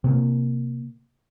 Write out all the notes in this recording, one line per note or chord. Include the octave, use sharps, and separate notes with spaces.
C3 A#3